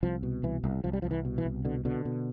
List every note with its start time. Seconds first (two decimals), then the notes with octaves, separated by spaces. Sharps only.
0.03 C2 F3
0.23 B2
0.43 C2 E3
0.64 C2
0.84 C2 F3
0.93 G3
1.02 C2 F3
1.11 E3
1.25 B2
1.38 E3
1.45 C2
1.65 B2 D3
1.85 B2 D3
2.05 B2